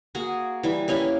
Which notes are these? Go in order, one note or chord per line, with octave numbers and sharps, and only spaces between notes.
A#3 F#4 G#4
E3 G3
A#3 C#4 E4 G4